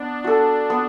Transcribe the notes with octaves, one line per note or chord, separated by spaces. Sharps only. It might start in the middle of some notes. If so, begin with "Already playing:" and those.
Already playing: B3 D4
F#4 A4
B3